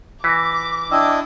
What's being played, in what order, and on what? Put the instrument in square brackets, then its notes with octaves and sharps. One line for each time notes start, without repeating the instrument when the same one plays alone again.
[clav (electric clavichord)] E3 [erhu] D6 [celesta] A#6 B6
[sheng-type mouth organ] D4 E4 D#5 [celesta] G5 E6